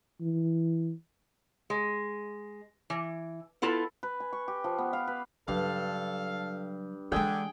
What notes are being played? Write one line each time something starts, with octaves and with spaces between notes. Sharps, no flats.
E3
G#3
E3
B3 E4 F4 A4
B4
G#5
C#6
G4
F3
B3
F5
B4
G2 C#3 F#3 A4 F5
D3 E3 G#3 G#4 G5